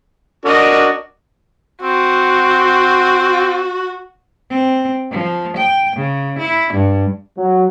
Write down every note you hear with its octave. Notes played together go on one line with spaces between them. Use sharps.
D4 F#4 A#4 D#5
C4 F#4
C4
F3
G5
C#3
E4
G2
F#3